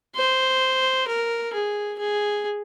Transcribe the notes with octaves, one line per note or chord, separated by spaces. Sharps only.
C5
A#4
G#4
G#4